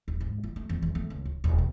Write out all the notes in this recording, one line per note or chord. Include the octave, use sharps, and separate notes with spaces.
D#1
G#2
E4
A3
E2
E2
A3
C#2
D1
D#1
B2